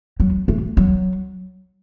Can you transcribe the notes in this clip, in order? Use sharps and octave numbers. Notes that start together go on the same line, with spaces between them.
F#3
A3
F#3